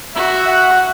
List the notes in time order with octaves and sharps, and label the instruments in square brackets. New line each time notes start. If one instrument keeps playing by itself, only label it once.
[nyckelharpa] F#4 [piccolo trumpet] E5
[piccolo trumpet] F#5